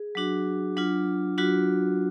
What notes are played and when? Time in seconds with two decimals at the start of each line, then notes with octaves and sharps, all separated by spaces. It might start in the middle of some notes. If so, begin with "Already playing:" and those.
Already playing: G#4
0.15 F#3 D4 F#4
0.77 F#3 D4 F4
1.38 F#3 D4 F4 F#4